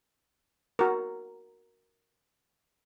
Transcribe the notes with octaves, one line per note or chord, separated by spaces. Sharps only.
F#4 A#4